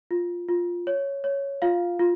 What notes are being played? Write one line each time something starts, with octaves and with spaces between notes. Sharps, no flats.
F4
F4
C#5
C#5
F4 F5
F4